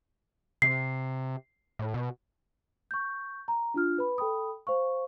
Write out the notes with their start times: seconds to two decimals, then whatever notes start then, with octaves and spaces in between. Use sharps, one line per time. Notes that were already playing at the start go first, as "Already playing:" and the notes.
0.62 C3 C7
1.79 A2
1.94 B2
2.91 C#6 G6
3.48 A#5
3.74 D4 F4 F6
3.98 B4 B5
4.18 A4 G5 B5 D#6
4.67 C5 F5 C#6